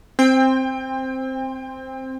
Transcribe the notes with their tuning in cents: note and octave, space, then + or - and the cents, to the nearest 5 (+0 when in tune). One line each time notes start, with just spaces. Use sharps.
C4 +0 G5 +30